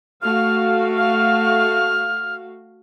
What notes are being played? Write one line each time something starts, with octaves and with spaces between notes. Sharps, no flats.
A3 F#4 F5 F6
F6